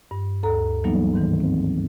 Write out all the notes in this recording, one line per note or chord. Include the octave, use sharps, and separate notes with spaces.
G2
D2 A4 A#5
E3 F#3 G3 A#3 B3 D#4
G#2 D#3 E3
C4